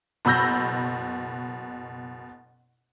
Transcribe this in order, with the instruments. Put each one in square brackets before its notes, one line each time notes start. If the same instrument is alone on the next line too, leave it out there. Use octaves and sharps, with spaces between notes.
[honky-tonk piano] F#1 B2 B5 E6 G6 A#6